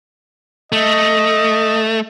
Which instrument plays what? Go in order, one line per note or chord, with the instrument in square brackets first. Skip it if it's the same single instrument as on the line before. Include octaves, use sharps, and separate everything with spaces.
[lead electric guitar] A3 [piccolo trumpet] D#5